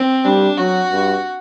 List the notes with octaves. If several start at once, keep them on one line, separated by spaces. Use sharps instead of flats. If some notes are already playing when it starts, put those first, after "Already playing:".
Already playing: C4
G3 D4
F#3 F#4
G2